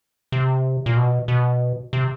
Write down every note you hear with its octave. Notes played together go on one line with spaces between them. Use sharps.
C3
A#2
B2
B2
C3